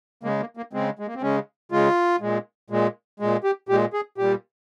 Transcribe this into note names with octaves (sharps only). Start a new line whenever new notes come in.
C#3 G#3 A#3
A#3
A#3
C#3 G#3 C4
G#3
A#3
C4
C#3 G#3 C#4
C#3 G#3 F4
A#2 G#3
A#2 G#3
A#2 G#3
G4
A#2 G#3 G4
G#4
A#2 G3 G4